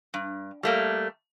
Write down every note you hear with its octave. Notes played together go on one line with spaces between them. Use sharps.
G2
G3 A3 A#3